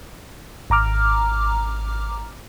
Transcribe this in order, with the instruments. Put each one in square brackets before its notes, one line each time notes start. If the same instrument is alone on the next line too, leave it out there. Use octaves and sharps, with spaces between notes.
[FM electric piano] G#1 A#5 D6 F6